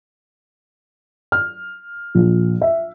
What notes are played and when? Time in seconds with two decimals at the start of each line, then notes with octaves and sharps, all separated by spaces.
1.32 F6
2.15 A#1
2.61 E5